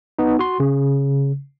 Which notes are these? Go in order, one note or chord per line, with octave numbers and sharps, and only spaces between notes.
B3 D#4
F#4 C6
C#3